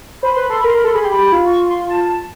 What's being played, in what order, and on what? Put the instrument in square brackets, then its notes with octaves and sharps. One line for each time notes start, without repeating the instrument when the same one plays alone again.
[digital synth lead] C5 [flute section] B5
[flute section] C6
[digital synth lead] B4 [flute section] B5
[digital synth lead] A4 [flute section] C6
[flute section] B5
[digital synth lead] A#4
[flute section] C6
[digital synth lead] A#4 [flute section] B5
[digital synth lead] A4 [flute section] C6
[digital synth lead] G#4 [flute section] B5
[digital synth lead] G4 [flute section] C6
[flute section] B5
[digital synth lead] G4
F4
[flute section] C#6
C6
A5